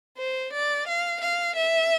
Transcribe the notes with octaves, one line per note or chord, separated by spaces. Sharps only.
C5
D5
F5
F5
E5